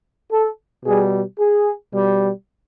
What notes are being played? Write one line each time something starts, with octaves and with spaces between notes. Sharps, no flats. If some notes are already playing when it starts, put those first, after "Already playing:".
A4
B2 G3 G#4
G#4
B2 G3